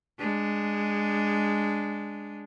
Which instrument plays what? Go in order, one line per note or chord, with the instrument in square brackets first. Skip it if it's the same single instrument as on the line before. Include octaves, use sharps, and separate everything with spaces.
[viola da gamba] G#3 D4